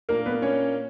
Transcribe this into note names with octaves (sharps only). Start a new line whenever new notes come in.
A#2 A#3 D4 A#4
B3 B4
C#4 C#5